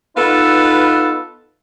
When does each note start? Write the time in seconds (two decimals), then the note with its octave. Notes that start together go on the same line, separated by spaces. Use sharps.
0.17 B3 D#4 F4 A4 B4